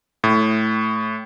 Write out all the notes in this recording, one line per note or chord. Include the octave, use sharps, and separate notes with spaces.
A2